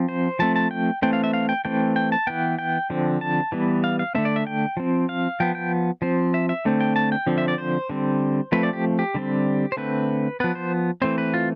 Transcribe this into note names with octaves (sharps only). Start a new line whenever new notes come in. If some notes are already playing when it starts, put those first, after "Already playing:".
Already playing: F3 C4
C5
F3 A3 C4 A5
A5
G5
E3 A3 C4 G5
F5
E5
F5
G5
E3 A3 C4 G5
G5
A5
E3 B3 G5
G5
D3 F3 C4
A5
E3 G3 B3
F5
F5
D3 A3 C4 E5
D5
E5
G5
F3 C4
F5
F3 B3 G5
G5
F3 C4 C5
E5
E5
D3 A3 C4
G5
A5
G5
D3 F3 C4
E5
D5
C5
D3 G3 C4
F3 A3 C4 B4
D5
G4
G4
D3 G3 C4
C5
D3 A3 C4 B4
F3 B3 B4
C5
E3 A3 C4 C5
B4
F4